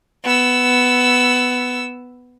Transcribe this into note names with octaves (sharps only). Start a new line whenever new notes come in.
B3 E6